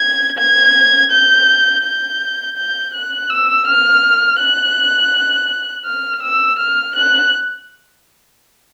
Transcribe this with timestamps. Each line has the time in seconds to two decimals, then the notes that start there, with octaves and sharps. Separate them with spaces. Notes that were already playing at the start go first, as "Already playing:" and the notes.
Already playing: G#6
0.39 G#6
1.12 G6
1.84 G6
2.57 G6
2.94 F#6
3.30 E6
3.67 F6
4.39 F#6
5.86 F6
6.23 E6
6.59 F6
6.96 F#6